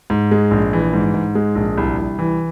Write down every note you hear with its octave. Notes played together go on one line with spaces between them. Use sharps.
G#2
G#3
A#1
E3
G#2
G#2
G#3
A#1
C2
C2
E3